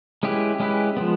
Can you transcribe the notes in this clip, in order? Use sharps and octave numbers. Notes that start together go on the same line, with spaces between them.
G#3 C#4 E4 G4 B4
G#3 C#4 E4 G4 B4
F3 G#3 B3